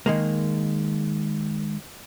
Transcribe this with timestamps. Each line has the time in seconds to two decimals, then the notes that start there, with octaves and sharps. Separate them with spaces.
0.06 D#3 G#3 A#3